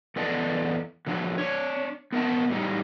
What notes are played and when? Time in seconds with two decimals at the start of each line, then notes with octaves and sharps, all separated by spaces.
0.16 E2 B3 A4 D5 D#5 A5
1.07 D3 F3 F#3 D4
1.38 D4 C#5
2.12 B3 A#4 D#5 A5
2.50 A2 G3 D#4